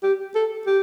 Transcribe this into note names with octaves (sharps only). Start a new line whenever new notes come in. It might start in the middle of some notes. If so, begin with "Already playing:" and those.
G4
A4
G4